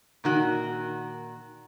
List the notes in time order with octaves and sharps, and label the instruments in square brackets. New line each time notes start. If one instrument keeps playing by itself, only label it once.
[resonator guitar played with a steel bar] A#2 D#3 F#4